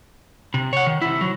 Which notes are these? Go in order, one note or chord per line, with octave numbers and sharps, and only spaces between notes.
C3
C#5 F#5
D#3
C3 E4
F#3